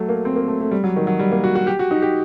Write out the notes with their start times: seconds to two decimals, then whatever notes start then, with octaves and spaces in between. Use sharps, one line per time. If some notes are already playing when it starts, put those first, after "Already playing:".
Already playing: F#3 A3
0.09 A#3
0.25 C4
0.36 A#3
0.48 A3
0.60 A3
0.71 G3
0.84 F#3
0.96 D#3
1.07 F#3
1.19 G3
1.31 A#3
1.44 F#4
1.55 F#4
1.67 G4
1.79 F#4
1.91 D#4
2.02 G4